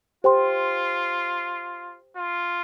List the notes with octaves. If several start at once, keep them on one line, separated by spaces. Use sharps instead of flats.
F4 G4 C5 G5 C6
F4